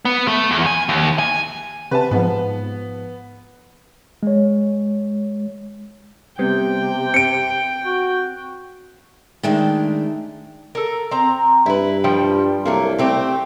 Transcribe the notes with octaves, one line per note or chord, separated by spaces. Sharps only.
B3
A3
E2
G#5
D#2
G#5
C3 B4 A5
G#2 F3 B3
G#3 C#5
C3 G3 B3 C4 G5
C4 C#7 D7
F#4
D#3 G#3 A3 D4 G5
A4 A#4
C4 A#5
G2 E4 B4
F3 G3 G5
C2 F#3 A3 A#3
A3 C4 G4